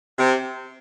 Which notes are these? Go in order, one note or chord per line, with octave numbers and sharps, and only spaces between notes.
C3